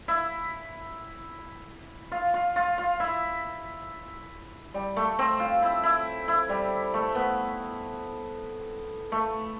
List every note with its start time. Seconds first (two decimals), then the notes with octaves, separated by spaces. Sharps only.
0.08 E4
2.12 F4
2.34 F4
2.56 F4
2.78 F4
3.00 E4
4.74 G3
4.97 A3
5.19 C4
5.39 F4
5.62 E4
5.83 E4
6.28 E4
6.49 G3
6.94 A3
7.15 B3
9.12 A3